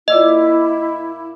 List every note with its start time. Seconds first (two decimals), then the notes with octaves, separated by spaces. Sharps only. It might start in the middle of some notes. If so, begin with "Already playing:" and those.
0.08 A#2 E4 D#5 E5 D6